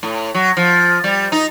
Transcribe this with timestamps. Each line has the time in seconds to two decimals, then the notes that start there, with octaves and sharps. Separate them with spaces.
0.03 A2
0.34 F#3
0.57 F3
1.04 G3
1.32 D#4